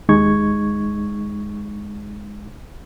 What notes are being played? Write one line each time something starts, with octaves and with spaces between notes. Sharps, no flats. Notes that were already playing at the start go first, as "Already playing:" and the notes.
D#2 G#3 D#4 C#6 G#6